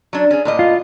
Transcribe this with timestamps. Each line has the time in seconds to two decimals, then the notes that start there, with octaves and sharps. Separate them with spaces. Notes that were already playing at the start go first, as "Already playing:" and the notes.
0.13 F#3 D4
0.31 C#4 G#4
0.45 A2 A#3 D#5
0.59 F4